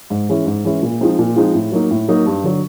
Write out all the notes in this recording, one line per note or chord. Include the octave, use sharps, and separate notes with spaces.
G#2
E3 G#3 C#4 E4
G#2
E3 G#3 C#4 E4
A#2
F3 G#3 C4 D#4
A#2
F3 G#3 C4 D#4
A2
F#3 A#3 D#4
A2
F#3 A#3 D#4
G2
D3 F#3